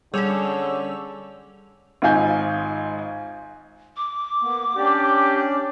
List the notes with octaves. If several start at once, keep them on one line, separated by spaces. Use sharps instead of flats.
D3 G3 C#4 G#4 A4 C#5 E6 F7
G#1 G#2 F4 G#5 G6
D6
A#3 B3
C#4 D4 G4 D5